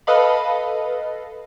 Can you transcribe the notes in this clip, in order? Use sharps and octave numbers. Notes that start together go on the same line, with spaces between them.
A4 B4 D#5 F5 B5